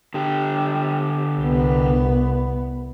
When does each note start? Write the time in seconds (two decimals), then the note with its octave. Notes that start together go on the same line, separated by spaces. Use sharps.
0.14 D3 G4
1.38 C2 B3